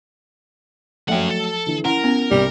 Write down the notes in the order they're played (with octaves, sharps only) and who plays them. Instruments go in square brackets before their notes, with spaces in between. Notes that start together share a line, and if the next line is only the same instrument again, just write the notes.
[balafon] F3 E5 G5 [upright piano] F#3 A3 [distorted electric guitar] C#4 F#5
[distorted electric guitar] A4
[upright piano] D3 E3
[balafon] C#4 E4 [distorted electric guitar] A#4 [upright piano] F#5
[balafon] B3 C#4
[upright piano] C2 [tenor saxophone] G3